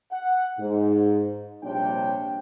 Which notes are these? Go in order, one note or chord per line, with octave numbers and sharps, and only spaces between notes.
F#5
G#2
A#1 C3 G3 D4 C#5 G5